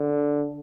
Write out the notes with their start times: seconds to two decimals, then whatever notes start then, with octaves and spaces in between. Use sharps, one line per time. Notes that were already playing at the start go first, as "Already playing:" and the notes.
Already playing: D3